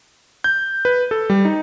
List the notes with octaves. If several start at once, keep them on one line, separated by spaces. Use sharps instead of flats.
G6
B4
A4
G3
D#4